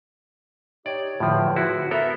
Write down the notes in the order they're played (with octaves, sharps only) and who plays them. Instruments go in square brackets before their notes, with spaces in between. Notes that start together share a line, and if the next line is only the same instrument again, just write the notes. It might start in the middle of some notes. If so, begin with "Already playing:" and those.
[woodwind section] D#4 G4 C#5 [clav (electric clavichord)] D5
[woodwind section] E2 D3 [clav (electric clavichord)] A2 F3
[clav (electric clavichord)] E4 F#4
[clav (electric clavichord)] B3 A4 A#4 [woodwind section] E5